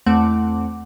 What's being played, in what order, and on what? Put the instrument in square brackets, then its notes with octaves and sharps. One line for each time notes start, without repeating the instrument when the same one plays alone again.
[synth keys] E2 A3 C4 F#5 D6